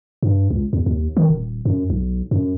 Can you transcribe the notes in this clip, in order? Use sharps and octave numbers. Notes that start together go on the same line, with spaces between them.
G2
C#2
E2
D#2
D#3
D#1
F#2
B1
F#2